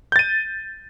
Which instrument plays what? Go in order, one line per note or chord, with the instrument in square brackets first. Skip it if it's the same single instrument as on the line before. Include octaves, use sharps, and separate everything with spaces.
[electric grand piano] G6
A6
D#7